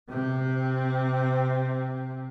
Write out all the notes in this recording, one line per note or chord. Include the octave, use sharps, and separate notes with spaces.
C3 C4